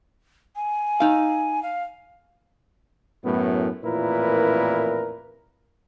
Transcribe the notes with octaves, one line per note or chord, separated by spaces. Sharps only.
G#5
D#4 F5
F5
F#2 A2 B3
A1 F2 A#2 E4 A#4 B4